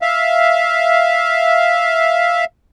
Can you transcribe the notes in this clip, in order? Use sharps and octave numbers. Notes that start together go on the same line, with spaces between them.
E5 F5